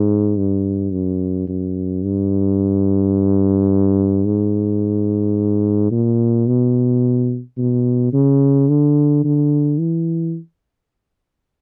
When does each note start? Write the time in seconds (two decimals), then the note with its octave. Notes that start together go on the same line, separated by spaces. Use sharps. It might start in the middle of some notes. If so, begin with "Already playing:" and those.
Already playing: G#2
0.37 G2
0.92 F#2
1.48 F#2
2.03 G2
4.25 G#2
5.91 A#2
6.47 B2
7.58 B2
8.13 C#3
8.69 D3
9.24 D3
9.80 E3